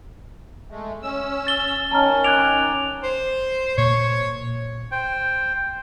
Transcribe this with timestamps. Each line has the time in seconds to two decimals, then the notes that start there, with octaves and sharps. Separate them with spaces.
0.70 G#3 A3
1.02 C#4 E6
1.47 A6 G7
1.91 D#3 C#4 A5 A#5 F6
2.24 D6 F#6 G#6 D7 F7
3.03 C5
3.78 A#2 A#3 C#5
4.91 C5 G5